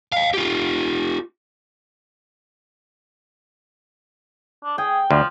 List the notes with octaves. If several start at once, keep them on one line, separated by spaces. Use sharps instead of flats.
D#5 F5
F4 G4
D4
G#4 G5
D2 F3